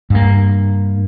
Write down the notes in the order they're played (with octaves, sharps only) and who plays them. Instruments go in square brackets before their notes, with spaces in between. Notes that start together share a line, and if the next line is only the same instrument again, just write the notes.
[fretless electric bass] G2 A#3